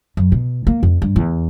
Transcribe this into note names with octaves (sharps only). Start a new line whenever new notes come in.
F#2
B2
A#3
F2
G2
E2